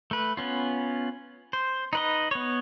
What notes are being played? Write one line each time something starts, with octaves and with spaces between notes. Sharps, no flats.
A3 B4
B3 C#4 F4
C5
D#4 B4 D#5
B3 C#5